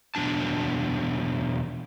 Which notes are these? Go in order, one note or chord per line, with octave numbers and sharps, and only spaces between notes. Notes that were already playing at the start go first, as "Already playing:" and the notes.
E2 B2 E3 F#3 D4 A5